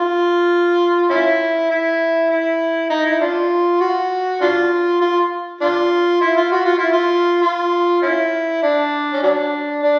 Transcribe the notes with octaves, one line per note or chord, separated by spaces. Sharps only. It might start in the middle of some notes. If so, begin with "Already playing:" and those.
Already playing: F4
C#4 E4
E4
E4
D#4
E4
D4 F4
F#4
D4 F4
F4
D4 F4
E4
F4
F#4
F4
E4
F4
F4
C#4 E4
D4
C#4
F#3 D4
D4